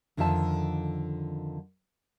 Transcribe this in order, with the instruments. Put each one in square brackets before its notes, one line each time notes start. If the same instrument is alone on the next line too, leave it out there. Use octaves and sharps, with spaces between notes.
[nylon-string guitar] F2 D3 D#3 F4 E5 A5